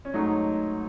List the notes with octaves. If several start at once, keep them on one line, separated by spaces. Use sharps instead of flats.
C#4
G#2 F#3 A3 D#4